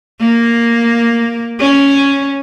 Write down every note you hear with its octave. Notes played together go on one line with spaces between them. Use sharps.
A#3
C#4